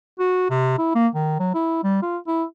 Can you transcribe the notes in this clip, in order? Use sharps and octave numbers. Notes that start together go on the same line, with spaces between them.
F#4
C3
E4
A#3
D#3
F#3
E4
G3
F4
E4